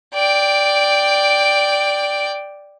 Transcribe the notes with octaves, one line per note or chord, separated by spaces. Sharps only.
D5 G5